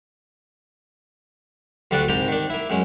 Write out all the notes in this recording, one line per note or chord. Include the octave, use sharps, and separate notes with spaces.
D2 G3 D4 F#4 D5 F#5
C2 G#2 G4 G5 A#5 C6
D#3 D4
A#3 E4
F#2 G#3 C#4